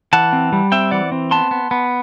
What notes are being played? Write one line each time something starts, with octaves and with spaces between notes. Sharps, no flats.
E3 F#5 A5
C4
G3
C4 E5 G5
E3 D5 F#5
C4
B3 A5 C6
B3
B3